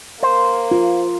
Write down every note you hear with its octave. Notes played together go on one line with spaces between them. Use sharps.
A#3 C5
F4